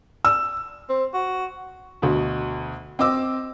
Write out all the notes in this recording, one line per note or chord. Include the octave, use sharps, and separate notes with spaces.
E6
C4
F#4
D2 B2
C4 D#5 D6 E6